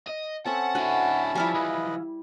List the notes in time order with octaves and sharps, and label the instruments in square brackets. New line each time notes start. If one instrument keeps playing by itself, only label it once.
[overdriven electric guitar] D#5
[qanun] C4 A4 E5 [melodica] C#4 A5 [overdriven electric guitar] F#5
[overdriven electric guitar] D3 E4 [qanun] F#4 [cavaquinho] F#5
[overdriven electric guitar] F3 [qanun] G3 E4 [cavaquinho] E5 F5 G#5
[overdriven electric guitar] E3 F3 [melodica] B4 D#5